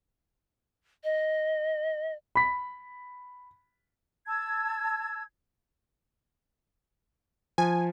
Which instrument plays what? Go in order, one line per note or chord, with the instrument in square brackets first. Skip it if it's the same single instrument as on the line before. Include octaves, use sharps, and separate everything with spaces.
[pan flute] D#5
[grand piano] B5 B6
[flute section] A5 E6 G#6
[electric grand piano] F3 [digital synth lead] G#5